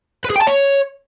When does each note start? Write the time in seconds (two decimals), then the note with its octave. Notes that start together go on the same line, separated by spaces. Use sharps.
0.24 B4
0.30 G#4
0.36 G5
0.42 A5
0.47 C#5